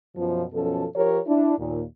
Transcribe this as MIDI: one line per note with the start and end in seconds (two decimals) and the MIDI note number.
0.16 0.44 42
0.16 0.44 47
0.16 0.44 53
0.53 0.85 42
0.53 0.85 47
0.53 0.85 53
0.53 0.85 61
0.53 0.85 69
0.96 1.18 53
0.96 1.18 67
0.96 1.18 70
0.96 1.18 73
1.27 1.54 62
1.27 1.54 64
1.57 1.82 39
1.57 1.82 46